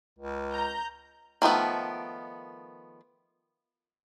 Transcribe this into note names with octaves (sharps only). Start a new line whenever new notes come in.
C#2
A#5 G6
D#3 F3 A3 B3